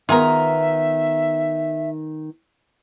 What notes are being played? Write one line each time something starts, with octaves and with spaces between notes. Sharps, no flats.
D#3 B3 F4 G#4 A#4 E5